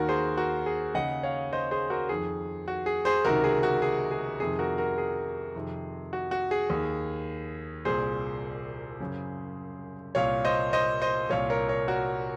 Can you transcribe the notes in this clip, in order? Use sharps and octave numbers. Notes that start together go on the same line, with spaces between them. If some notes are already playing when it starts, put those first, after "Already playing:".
Already playing: D#2 D#3 F#4 A#4
G#4 C5
F#4 A#4
G#4
D#2 C#3 D#5 F#5
C#5 F5
C5 D#5
G#4 C5
F#4 A#4
F2 D#3 G#4
F#4
G#4
G#4 C5
C#2 C3 D#3 F#4 A#4
G#4
F#4
G#4
G#4
F2 C3 D#3 G#4
F#4 A#4
F#4 A#4
G#4
F2 C3 D#3
F#4
F#4
G#4
D#2 D#3
C2 A#2 G#4 C5
F#2 C#3
C2 A#2 C#5 F5
C5 D#5
C5 D#5
C5 D#5
C2 A#2 C#5 F5
A#4 C#5
A#4 C#5
F#4 A#4